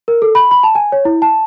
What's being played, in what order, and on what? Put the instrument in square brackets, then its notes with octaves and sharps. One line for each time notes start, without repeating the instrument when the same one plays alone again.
[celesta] A#4
A4
B5
B5
A5
G#5
C#5
E4
A5